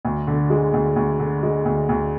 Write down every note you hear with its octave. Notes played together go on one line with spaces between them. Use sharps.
D2
D3
G#3
D2
D2
D3
G#3
D2
D2